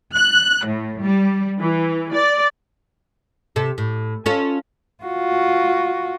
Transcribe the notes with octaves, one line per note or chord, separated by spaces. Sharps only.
F#6
A2
G3
E3
D5
C3 A4
A2
C#4 F4 A4
F4 F#4